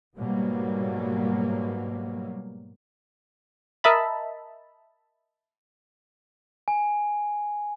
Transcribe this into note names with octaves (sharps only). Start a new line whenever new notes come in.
G#2 B2 F#3 G3 A#3
A#4 D#5 E5 A5 B5
G#5